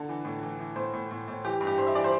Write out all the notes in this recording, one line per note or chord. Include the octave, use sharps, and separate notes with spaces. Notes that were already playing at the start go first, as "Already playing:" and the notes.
Already playing: D3 A4
E3
A2
E3
E3
A2 C5
A2
A2
A2
E3 G4
G2
G4
G2 C5
E5
E3 D5
C5